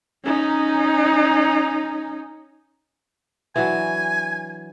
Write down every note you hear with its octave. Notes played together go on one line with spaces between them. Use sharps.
C#4 D#4
E3 F#3 D4 G#5